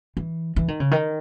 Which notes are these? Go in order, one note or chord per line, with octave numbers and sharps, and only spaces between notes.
E3
E3
D#3
C#3
D#3